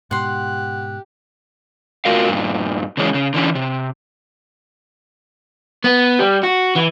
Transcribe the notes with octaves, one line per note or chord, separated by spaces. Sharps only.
G#2 B2 G4 F#5 C6 F#6
A3 F4 F#4 A#4 F5
G2 A#2
C#3 E3 G#3 C#4
C#3
D3 E3 C#4
C3
B3
G3
F#4
E3